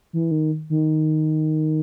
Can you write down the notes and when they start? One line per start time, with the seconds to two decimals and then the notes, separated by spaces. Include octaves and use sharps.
0.13 E3
0.31 D#3
0.70 D#3